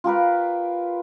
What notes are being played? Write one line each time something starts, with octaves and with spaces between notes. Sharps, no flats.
F4 G4 A#4 B4